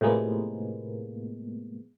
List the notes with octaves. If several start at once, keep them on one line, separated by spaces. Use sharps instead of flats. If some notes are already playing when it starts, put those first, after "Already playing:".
A2 C3 F3 G#3 A#3 B3